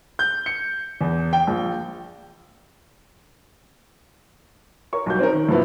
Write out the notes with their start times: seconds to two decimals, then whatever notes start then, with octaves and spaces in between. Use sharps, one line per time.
0.19 G6
0.46 C#7
1.01 E2
1.33 G5
1.47 A#1
4.93 A#4 C#5 C#6
5.06 B1 G3 F#4 G6
5.19 C4 C#4 D#4 A#4
5.33 D#3
5.49 G2 C3 F3 F#3 B3 E4